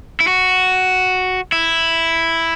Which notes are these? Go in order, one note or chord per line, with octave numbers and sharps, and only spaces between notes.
E4
F#4
E4